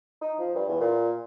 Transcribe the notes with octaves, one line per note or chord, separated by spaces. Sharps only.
D#4
F3
G2
E2
A#2